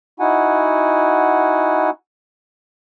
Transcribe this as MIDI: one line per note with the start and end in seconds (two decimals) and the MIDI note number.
0.20 1.90 63
0.20 1.90 64
0.20 1.90 66
0.20 1.90 78
0.20 1.90 80